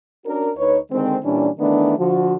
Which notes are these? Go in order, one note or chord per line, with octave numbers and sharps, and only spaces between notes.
C#4 D4 F#4 A#4
D2 D#4 B4 C#5
D3 D#3 G#3 C4
A#2 E3 G3 C#4 D4
D#3 E3 A3 B3 D4
D3 F3 F#4